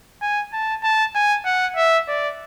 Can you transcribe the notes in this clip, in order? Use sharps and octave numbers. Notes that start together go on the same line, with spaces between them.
G#5
A5
A5
G#5
F#5
E5
D5